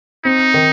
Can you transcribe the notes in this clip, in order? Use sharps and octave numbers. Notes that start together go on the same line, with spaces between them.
C4 D#4
D#3